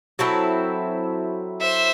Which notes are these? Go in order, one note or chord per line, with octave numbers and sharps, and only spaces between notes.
F#3 C4 E4 A4
C5 E5